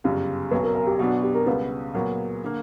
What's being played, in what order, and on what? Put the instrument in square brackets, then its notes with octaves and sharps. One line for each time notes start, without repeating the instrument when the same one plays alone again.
[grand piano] G1 F#2 C#3 [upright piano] G4
[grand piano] B1 B2 F#3 [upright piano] B4
[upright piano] A#4
A#4
G4
[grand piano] B2 F#3 B3 D4 [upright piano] F#4
[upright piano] G4
A#4
[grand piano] C#2 C#3 G3 B3 [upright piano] B4
[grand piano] A#2 F#3 B3 [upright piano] A#4
[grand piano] D3 A#3